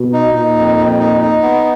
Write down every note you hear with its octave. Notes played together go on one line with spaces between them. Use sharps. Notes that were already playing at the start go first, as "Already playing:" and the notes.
Already playing: B2
D#4
A#2 D#4
F2
F2
D#4
D#4
B3